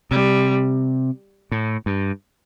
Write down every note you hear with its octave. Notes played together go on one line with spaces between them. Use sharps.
C3 G3
A2
G2